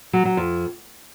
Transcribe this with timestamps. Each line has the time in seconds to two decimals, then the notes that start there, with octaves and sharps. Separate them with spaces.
0.13 F#3
0.25 F#3
0.37 F2